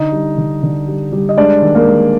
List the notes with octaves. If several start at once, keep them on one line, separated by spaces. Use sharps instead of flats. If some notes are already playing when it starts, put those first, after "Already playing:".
Already playing: D3 D#4 D#5
G3
D3
D3
G3
G3
D#5
G#3 D4 D5
D#3
A#3 A#4
G#3